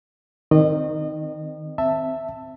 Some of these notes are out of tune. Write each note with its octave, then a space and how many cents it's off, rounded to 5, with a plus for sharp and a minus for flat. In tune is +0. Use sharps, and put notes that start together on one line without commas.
D#3 +0 C4 -5 D#5 -35
C4 -5 E5 +0 A5 +15